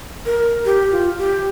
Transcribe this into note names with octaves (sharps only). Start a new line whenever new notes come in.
A#4
G4
F4
G4